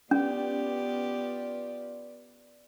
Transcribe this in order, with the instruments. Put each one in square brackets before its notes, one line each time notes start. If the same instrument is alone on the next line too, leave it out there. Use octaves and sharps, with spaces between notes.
[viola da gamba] B3 G4 [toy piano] C#4 [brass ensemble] F4 B4 D5